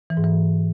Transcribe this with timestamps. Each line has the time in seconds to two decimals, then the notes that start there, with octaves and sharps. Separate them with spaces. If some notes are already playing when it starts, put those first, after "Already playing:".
0.10 E3
0.17 G#2
0.24 E3